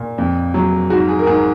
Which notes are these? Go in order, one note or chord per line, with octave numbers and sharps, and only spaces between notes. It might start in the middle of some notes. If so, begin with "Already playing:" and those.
Already playing: A#2
F2
F#3
G#2 F#4
G#4
A#4
G#2 G#4